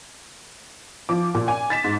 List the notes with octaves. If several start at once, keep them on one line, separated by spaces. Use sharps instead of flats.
F3 D6
A#2
G#5
A6 B6 E7
G#2